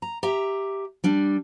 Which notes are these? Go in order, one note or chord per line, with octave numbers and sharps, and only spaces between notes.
A#5
G4 E5 A#5
G3 D4